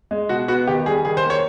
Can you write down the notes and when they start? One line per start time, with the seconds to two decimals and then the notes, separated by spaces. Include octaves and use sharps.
0.11 G#3
0.29 B2 F#4
0.48 B3 F#4
0.67 D#3 G4
0.86 G3 G#4
1.05 D#3 G#4
1.17 C5
1.24 A#3
1.30 C#5